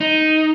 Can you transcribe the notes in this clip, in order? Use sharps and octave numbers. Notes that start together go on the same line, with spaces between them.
D#4